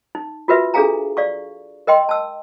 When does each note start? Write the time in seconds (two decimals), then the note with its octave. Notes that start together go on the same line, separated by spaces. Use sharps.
0.15 D#4
0.48 F4 F#4 A#4 B4 E5
0.74 D4 G#4 A4 F5 G#5 A#5
1.17 D5 F5 C#6
1.87 A#4 D#5 G5 C6
2.09 A5 E6